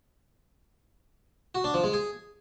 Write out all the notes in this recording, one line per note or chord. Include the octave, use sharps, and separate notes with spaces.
F#4
D4
F3
G#3
G#4